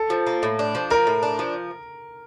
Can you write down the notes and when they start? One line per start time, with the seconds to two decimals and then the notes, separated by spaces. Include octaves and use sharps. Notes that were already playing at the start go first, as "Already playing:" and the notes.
Already playing: A4
0.10 F3
0.27 A#3
0.43 A2
0.59 D4
0.75 F3
0.90 A#3 A#4
1.07 A2
1.23 D4
1.39 F3